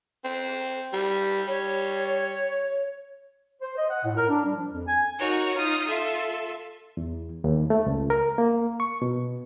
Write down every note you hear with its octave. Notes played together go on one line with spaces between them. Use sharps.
C4
G3
G3 C#5
C5
D#5
F#5
A2
A#4
D4
G3
F3
F2
G#5
D#4 F#4 A#4 C#5
D#4 F4 D#6 F6
F4 A4 E5
E2
D#2
A3
C#2
A#4
A#3
C#6
B2